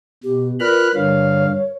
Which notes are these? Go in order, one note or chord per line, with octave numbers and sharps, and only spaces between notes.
B2 G4
F4 A#4 B4 D5 B5 F6 F#6
G2 D3 C#5 F5